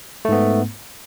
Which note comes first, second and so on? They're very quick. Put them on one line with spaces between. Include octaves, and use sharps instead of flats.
A3 G#2 B3